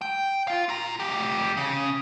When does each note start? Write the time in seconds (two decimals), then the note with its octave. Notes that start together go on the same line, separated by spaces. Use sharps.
0.01 G5
0.48 F4 F5
0.69 F4 A#5
1.00 F2 G4
1.57 C#3